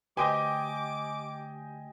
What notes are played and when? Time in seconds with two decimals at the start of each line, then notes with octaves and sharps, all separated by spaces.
0.17 D2 G4 B4 C5 D#5 G5 G#5 D6